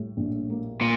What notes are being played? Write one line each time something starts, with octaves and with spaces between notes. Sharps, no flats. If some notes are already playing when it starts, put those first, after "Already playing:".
Already playing: A2 G3
A#1
A#3
A#2